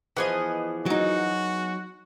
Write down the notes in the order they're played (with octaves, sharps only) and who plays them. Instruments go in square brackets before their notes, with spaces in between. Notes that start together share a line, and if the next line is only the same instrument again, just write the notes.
[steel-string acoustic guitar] E3 F3 [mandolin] B3 G#4 D#5
[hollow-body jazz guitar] F#3 D#4 [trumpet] F#4